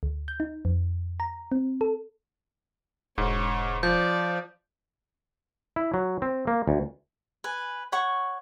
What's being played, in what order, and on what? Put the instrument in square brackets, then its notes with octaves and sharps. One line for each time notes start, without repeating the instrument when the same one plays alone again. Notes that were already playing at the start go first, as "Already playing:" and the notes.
[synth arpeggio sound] D2
G6
D#4
F2
A#5
C4
A4
[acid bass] E1 [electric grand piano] G#2 [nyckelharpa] C#5
[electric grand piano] F3 [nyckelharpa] D5 [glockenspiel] G6
[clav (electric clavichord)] E4
F#3
C4
A#3
D2
[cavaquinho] B4 G#5
C#5 F#5 C#6